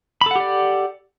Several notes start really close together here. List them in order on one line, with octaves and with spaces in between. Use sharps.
B5 A4 F#5 G4 D5